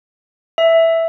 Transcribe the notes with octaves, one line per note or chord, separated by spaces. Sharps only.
E5